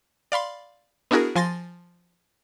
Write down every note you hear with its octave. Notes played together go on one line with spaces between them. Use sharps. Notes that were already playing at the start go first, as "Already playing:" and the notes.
D5 F5 B5 C6
B3 D4 E4 F#4 G#4 A#4
F3 G#5 C6 A6 A#6